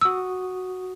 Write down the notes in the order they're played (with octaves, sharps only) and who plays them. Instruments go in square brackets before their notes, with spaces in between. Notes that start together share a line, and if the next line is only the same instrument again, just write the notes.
[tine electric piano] F#4 D#6 [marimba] E6